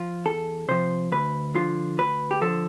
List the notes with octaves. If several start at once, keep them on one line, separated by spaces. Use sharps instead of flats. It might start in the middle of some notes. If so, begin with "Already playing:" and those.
Already playing: F3 F4
E2 A4
C3 F3 C5
D2 B4
D3 F3 F4
D2 B4
G4
D3 F3 A4